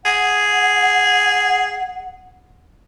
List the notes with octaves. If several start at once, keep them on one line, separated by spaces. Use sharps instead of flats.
G#4 F#5